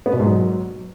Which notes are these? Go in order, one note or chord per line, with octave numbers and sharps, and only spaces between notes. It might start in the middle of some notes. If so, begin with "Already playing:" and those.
B3
B2
G#2
F#3